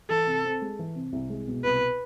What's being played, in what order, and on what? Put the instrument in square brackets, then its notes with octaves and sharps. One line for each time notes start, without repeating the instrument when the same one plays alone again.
[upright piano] E3 [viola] A4
[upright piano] C3
C4
G#3
E3
C3
C2
G#3
B2
[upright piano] C2 [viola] B4